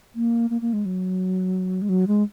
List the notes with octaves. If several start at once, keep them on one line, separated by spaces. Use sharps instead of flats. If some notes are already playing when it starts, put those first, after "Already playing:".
A#3
A#3
A#3
G#3
F#3
G#3
F#3
G#3